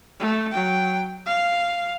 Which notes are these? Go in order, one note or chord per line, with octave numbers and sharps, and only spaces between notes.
A3
F#3 G5
F5